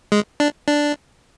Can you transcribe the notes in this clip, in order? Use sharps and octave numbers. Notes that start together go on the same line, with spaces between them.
G#3
D4
D4